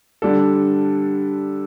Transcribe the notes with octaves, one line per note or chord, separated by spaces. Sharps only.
D3 G3 D4 A4